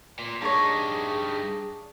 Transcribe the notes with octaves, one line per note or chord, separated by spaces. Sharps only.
A#2
G2 D4 D#4 G#4 C#5